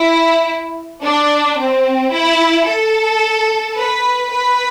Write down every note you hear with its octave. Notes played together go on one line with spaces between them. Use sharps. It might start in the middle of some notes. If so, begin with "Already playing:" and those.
Already playing: E4
D4
C4
E4
A4
B4
B4